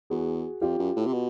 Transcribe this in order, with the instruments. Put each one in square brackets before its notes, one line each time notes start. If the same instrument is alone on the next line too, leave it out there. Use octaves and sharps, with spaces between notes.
[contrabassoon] E2 [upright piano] F#4 G#4
[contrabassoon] F2 [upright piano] F4 G4
[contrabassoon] F#2
A2
C3
B2